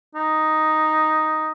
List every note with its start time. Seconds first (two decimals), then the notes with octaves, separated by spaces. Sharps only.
0.15 D#4